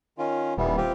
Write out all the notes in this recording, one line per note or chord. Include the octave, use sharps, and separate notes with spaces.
D#3 C#4 F4
D#1 E3 G3 B3
C4 F4 G4